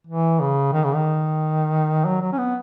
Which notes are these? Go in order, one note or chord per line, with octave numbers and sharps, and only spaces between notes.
E3
C#3
D#3
C#3
D#3
F#3
F#3
C#4
B3